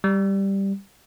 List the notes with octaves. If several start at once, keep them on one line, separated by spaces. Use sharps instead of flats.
G3